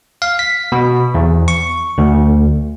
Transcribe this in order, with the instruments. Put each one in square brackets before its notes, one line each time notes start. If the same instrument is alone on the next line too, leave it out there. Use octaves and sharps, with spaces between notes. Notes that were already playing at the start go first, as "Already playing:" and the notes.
[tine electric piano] F5
B6
B2
E2
C#6
D2